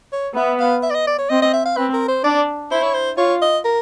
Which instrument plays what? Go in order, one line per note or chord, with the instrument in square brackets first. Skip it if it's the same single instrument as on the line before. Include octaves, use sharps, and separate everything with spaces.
[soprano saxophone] C#5
[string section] B3 [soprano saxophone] E5
[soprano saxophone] F5
E5
D5
D#5
D5
C#5
[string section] C4 [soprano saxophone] D#5
[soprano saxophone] D#5
E5
F5
[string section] C4 [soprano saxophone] B4
[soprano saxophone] A#4
C5
[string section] D4 [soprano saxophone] D5
[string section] E4 [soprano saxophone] C5
[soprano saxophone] C#5
C5
[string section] F4 [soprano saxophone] C#5
[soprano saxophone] D#5
A#4